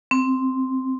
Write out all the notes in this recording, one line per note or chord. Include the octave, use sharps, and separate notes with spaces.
C4